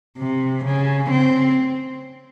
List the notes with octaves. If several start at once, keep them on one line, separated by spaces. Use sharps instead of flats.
C3
C#3
C4